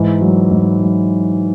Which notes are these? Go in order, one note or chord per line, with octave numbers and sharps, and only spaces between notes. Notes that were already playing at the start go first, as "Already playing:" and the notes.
Already playing: G#2 E3
F#3
G#2
F#3